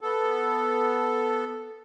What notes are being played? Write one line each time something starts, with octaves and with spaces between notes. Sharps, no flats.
B3 A4